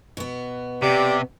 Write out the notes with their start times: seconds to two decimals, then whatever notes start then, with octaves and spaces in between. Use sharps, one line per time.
0.17 B2 B3
0.82 C3 G4 D5